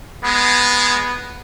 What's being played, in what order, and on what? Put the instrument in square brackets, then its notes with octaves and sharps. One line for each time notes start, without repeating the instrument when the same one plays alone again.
[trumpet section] G#3 [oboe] B3